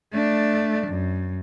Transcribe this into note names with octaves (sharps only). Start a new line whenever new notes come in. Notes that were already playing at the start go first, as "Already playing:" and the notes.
A3 D4
F#2